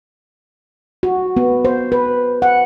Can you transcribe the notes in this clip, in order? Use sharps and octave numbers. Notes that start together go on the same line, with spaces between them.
F#4
B3
C5
B4
F#5